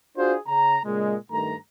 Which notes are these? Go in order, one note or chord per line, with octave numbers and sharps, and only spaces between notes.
D4 F4 F#4 G#4 C5
C#3 A#5
A#2 C#3 G#3
G2 D#3 A3 A#5